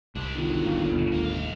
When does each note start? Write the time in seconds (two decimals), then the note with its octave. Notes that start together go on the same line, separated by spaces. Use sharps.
0.16 C2 D4 E4
0.35 G1 D#3 F#3
0.66 D#1 A#1 A#3
0.91 D#2 B2
1.12 D#1 D#2 A2 A#3
1.24 C2 F5